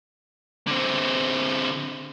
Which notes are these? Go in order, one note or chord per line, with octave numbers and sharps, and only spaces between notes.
D3 C4